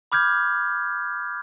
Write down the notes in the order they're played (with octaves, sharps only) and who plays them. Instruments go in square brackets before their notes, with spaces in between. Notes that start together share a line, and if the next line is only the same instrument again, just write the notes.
[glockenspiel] B5 D6 F6 G6 G#6